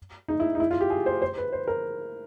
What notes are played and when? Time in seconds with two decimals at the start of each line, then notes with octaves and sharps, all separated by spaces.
0.28 D#4
0.40 E4
0.55 D#4
0.60 E4
0.71 F4
0.81 G4
0.90 G#4
1.06 C5
1.22 C5
1.38 B4
1.53 C5
1.68 A#4